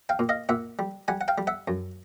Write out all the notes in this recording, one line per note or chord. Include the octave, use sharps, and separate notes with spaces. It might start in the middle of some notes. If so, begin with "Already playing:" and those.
F5 G5
A#2
D#5 F5
A#2 E5 F#5
G3
G3 F#5 G#5
F#5
F5 G5
G3
E5 F#5
F#2